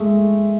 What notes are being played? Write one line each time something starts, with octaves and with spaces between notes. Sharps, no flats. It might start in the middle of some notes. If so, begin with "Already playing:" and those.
Already playing: G#3 A3